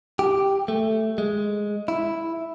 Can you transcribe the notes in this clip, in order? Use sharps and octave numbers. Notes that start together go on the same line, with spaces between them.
G4
A3
G#3
E4